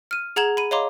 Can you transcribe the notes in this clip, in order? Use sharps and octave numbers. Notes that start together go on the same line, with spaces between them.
F6 D#7
G#4 F#5 A#5 G#6 E7 F#7
B5 D#7
C#5 D#5 F5 A#5 C6 D6